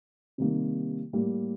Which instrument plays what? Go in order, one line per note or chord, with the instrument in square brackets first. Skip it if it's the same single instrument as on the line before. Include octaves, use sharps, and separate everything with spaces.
[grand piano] C3 D#3 G3 A#3
A2 G3 A#3